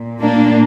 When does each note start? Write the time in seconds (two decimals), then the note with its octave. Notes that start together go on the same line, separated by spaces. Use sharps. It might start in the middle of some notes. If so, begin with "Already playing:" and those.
Already playing: A#2
0.21 A#3 D4